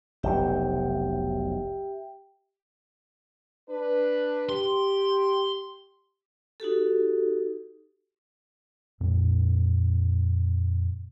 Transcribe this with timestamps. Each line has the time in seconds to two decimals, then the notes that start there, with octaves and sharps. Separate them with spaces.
0.23 F1 B1 C3 G4 E5 G5
3.69 D4 B4
4.49 G4 C6
6.60 D#4 F#4 G4 A4
9.01 F2 A#2 G#3 C4